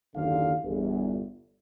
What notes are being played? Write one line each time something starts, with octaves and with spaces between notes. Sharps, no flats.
F#1 D#2 D3 F5
G1 E2